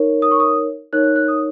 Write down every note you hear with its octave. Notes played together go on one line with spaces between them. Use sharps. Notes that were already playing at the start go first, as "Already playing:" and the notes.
Already playing: D#4 A#4 C#5
D#6
C#6
D#6
D#4 A#4 C#5 F#6
F#6
F#6
D#6